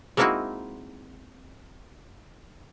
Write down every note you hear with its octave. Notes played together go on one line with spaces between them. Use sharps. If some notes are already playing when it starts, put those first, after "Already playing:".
G#3 A#3 C4 D#4 E4 F#4